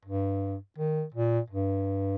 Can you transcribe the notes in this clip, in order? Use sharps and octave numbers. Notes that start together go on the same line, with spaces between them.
G2
D#3
A#2
G2